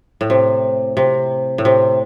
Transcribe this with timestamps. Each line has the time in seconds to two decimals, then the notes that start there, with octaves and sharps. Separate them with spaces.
0.21 A2
0.30 C3
0.97 C3
1.58 A2
1.65 C3